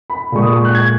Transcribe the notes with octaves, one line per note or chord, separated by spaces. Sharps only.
B5
A#2 G#3 C#6
D#6
C#6
F#6
G#6